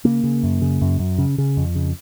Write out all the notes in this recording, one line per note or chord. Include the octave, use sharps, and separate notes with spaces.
C#3 A#3
C#3
F#2
C#3
F#2
F#2
C#3
C#3
F2
C#3